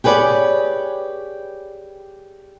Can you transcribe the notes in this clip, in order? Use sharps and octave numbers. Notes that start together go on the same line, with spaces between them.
G4 G#4 B4 C#5 D5